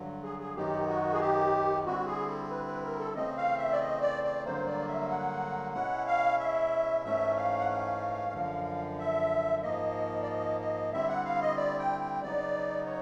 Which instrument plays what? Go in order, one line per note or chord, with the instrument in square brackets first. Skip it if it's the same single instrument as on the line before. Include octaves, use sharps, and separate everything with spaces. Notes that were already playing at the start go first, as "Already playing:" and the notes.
Already playing: [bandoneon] G2 D3 F#3
[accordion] G#4
G#4
[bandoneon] F#2 D#3 F#3 B3 D#4 [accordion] G4
[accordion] F#4
G#4
G4
[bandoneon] D3 G3 C4 E4 [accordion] F#4
[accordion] G#4
A4
B4
B4
A#4
A4
[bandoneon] C#3 E3 A3 C4 [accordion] D#5
[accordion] F5
E5
D5
D#5
D5
D5
[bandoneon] G2 D3 F#3 A#3 [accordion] C5
[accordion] D5
E5
F#5
[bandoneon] B2 G#3 C#4 E4 [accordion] F#5
[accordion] F5
E5
[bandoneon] G#2 E3 A3 C#4 [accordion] E5
[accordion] F5
F#5
F5
[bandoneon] F#2 D3 F3
[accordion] E5
[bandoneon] G#2 F3 A#3 [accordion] D#5
[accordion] D5
D#5
D#5
[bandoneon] D3 G3 C4 E4 [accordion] E5
[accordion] F#5
F5
D#5
D5
G5
G5
[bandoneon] C#3 F#3 B3 D#4 [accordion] D5
[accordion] C#5